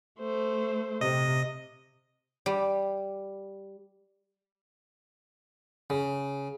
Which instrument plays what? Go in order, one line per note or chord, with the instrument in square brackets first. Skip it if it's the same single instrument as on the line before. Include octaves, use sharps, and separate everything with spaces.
[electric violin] A3 C5
[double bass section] C3 [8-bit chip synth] D#5
[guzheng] G3
[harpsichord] C#3